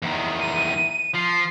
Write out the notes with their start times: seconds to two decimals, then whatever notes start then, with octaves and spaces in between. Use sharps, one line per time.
0.02 E2 D#3
0.40 D#7
1.15 F3 C7